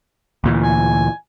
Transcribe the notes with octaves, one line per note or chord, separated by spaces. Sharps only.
D2 A#2 E3
G#5